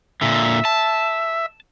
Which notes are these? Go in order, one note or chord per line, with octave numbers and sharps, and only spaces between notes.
A#2 D3 E5
A5